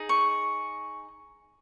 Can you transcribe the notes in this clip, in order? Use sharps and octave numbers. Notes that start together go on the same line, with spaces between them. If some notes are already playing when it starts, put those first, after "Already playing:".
Already playing: D#4 G#4
C#6